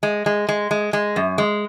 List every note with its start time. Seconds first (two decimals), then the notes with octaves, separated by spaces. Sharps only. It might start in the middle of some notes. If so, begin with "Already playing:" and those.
0.03 G#3
0.26 G#3
0.49 G#3
0.71 G#3
0.93 G#3
1.16 F#2
1.38 G#3